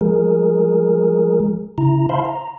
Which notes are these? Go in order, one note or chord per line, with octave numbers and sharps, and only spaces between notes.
F3 G#3 G#4 A#4
C#3 E4 A#5
C5 E5 F5 A5 B5 C6
A#5